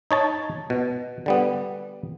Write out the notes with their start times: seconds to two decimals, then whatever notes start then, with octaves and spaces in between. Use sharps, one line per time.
0.11 D#4 C#5 A5
0.70 B2
1.26 D3 G3 B3